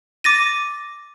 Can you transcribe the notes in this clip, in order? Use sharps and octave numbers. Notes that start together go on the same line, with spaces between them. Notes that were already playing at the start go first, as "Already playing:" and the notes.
D6 A6 A#6 D#7